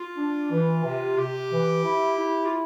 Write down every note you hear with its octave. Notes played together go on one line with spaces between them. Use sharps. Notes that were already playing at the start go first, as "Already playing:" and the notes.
Already playing: F4
D4
E3
C3
C3 G4
E3
E4
E4
F4